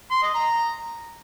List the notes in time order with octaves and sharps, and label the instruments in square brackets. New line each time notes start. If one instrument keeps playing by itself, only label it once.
[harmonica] C6
D#5
A#5